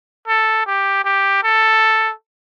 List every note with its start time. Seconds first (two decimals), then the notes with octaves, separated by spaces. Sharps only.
0.28 A4
0.66 G4
1.05 G4
1.43 A4